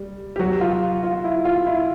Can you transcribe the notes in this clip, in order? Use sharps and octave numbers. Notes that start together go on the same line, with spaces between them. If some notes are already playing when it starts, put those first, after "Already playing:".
Already playing: G3
G4
F#3 F#4
F4
F4
E4
F4
E4